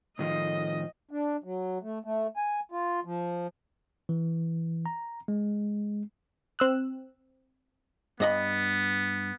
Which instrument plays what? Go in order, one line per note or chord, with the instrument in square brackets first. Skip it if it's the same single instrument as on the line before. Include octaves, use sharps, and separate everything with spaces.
[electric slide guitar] A2 D#3 F3 [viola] D#5
[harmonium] D4
F#3
A3
A3
G#5
F4
F3
[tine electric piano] E3
A#5
G#3
[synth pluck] C4 E6 F#6
[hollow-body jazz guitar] G2 D#5 B5 [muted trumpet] B3